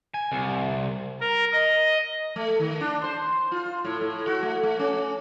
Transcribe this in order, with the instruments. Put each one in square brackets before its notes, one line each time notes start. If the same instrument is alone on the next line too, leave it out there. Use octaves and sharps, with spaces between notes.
[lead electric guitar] G#5
C2
[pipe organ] A#4
D#5
[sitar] A3
D#3
D4
C5
F4
A2
A2
F#4
A3
A3
C#4